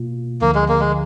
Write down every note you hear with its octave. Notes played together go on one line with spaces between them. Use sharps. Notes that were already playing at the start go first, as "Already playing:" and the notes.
Already playing: B2 A#3 F4
D2 D3 F3 A#3
G#3
A#3
G#3